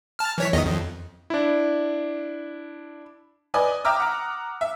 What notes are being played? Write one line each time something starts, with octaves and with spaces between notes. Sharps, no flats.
A5 F6
E3 C#5 B6
E2 D#3 D#5
F2
D4 E4
B4 D5 D#5 G#5 D#6
E5 G5 A#5 D6 E6 F6
F#5 A#5
E5